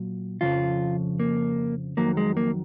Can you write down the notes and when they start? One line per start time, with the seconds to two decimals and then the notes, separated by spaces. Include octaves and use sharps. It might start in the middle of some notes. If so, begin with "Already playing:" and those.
Already playing: A#2 F#3
0.41 F2 C#3 F3 F4
1.20 A#3
1.97 F2 D#3 F#3 A#3
2.17 G#3
2.37 A#3